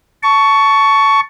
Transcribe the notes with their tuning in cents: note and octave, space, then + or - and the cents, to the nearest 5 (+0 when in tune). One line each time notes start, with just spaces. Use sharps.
A5 +0 C#6 +15